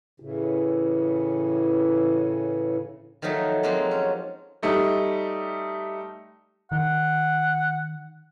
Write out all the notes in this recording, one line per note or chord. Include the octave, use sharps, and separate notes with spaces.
A2 C#3 E3
D#3 F3 F#3 A3 D#4
F3 F#3 G#3 A#3 C4
C#4
G3 A3 D#4
D#3 F#5